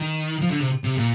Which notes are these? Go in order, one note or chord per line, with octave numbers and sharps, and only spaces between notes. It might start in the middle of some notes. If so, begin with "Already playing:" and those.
Already playing: D#3
F3
D3
C3
C3
A#2